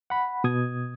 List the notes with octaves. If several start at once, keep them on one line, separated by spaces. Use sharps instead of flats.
F#5 B5
B2 D#6 G#6